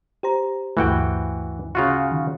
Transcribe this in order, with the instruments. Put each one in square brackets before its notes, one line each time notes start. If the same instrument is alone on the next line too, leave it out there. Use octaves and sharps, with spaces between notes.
[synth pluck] G4 C5 A#5
[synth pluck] D2 G2 A3 [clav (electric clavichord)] E3 F#4 G5
[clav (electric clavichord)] C#3 F4 F#4
[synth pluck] D#3